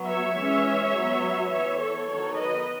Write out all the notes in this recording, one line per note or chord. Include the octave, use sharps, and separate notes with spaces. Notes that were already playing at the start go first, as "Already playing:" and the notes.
Already playing: F#3 B3
C#5 E5
E3 G#3 C#4
F#3 B3
E3 B3 C#5 E5
A4 C#5
D#3 F#3 B3 A4 C#5
B4 D#5